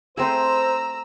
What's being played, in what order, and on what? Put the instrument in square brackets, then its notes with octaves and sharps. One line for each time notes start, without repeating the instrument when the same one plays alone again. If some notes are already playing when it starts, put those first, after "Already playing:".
[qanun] A3 C4 G#4 [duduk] C5 [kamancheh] A#5 E6